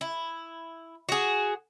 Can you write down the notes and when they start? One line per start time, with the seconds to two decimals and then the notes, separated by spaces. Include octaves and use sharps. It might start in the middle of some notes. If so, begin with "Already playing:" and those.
0.01 E4
1.09 F#4 G#4